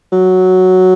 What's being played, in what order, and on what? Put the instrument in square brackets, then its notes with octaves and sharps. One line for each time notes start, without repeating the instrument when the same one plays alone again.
[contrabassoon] F#3